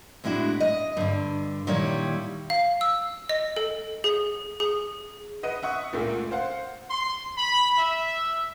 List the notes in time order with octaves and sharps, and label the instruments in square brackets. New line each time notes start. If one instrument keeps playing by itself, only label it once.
[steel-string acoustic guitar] A2 G#3 D4 E4 F#4
D#5
G2 D3
A#2 D#3 G3 E4 C#5
[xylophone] F5
E6
D#5
A4
G#4
G#4
[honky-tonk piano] B4 D#5 F#5 D#7
E5 F#5 C#6 D#6
C#2 A#2 A3 A#3
C5 F5 F#5
[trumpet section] C6
B5
E5